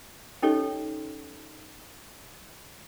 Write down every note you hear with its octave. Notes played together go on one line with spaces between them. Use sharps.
C#4 D#4 G4 A4 C#5 D#5